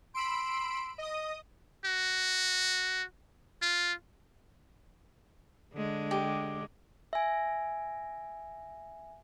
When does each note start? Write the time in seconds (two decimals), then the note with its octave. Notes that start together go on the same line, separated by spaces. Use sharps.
0.15 B5 C6 E6 D7
0.98 D#5 D#6
1.85 F#4
3.62 F4
5.74 D3 G#3
6.11 G4
7.13 E5 G#5